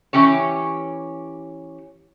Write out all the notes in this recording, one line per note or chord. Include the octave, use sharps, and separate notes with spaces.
E3 C#4 G4 C#5